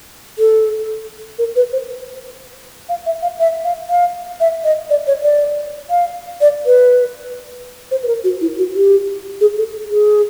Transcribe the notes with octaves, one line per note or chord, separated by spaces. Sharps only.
A4
A#4
B4
C5
F5
E5
F5
E5
F5
F5
E5
D#5
D5
C#5
D5
F5
D5
B4
C5
B4
A#4
F#4
E4
F#4
G4
G#4
A4
G#4